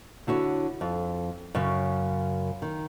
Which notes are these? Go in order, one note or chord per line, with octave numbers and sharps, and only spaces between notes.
D3 E4 F#4 C#5
F2
F#2 C#3
D#3